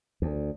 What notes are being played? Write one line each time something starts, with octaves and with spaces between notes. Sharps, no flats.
D2